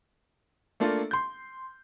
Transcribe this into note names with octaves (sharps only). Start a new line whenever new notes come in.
A3 A#3 D4 F4 A4
C6 G6